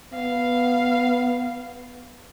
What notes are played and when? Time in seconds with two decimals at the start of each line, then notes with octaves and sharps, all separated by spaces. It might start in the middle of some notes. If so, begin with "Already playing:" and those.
0.14 B3 F5